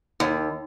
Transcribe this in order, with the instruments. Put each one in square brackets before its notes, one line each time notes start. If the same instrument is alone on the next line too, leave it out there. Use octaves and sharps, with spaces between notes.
[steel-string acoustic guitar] D#2